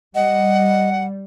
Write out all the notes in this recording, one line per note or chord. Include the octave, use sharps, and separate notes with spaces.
G3 D#5 F#5